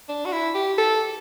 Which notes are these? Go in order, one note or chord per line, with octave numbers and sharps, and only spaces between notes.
D4
F#4
E4
G4
A4